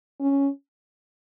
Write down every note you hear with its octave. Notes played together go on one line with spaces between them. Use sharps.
C#4